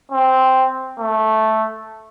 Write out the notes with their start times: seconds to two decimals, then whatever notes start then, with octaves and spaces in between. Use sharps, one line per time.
0.12 C4
0.99 A3